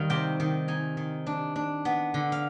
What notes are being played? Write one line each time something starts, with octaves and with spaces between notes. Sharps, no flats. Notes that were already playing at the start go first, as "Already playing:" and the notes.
Already playing: D#3 G3 F5
C3 G5
D#3
D#4 G#5
D#3
D4
D4
B3
D3
F5